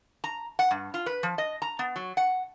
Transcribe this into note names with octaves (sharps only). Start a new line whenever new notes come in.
A#5
F#5
G2
F4
B4
F3
D#5
A#5
B3
F#3
F#5